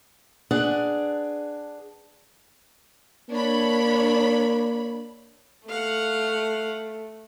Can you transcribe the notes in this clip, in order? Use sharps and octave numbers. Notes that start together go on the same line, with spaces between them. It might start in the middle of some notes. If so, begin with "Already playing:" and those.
D4 G#4 B4 D5 F#5
A#3 D4 C#5 B5
A3 F5 F#5